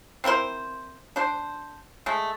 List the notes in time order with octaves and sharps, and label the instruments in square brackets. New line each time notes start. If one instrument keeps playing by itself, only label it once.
[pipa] C4 E4 A#4 C5
D4 C5
G#3 A3